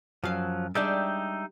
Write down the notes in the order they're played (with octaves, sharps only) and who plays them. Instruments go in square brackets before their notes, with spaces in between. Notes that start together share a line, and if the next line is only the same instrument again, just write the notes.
[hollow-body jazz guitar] F#2 F5 [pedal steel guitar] F3 F#3
[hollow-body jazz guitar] G3 G#3 D4 [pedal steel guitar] D#4 E5 G5